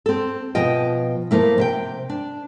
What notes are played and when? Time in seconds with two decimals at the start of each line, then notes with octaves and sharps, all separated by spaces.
0.06 C4 A4
0.55 B2 F3 F4 D#5 G5
1.31 F3 A3 A#3 E4
1.58 C3 E5 G5
2.09 D4